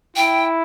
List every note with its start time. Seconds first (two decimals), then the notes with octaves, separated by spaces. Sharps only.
0.16 E4 G5